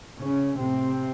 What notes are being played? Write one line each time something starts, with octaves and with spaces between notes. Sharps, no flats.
A2 C#3 C#4
A2 C3 C4